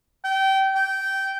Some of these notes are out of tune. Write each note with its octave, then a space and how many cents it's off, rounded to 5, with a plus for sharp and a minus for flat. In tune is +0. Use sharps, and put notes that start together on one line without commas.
G5 -25
G5 -15